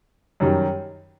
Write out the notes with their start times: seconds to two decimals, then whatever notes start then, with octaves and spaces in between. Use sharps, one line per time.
0.40 F#2 D#3 G3